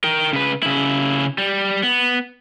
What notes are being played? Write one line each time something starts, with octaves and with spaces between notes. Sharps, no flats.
A#4 G5
C#3 B4
C#3 E4
G3
B3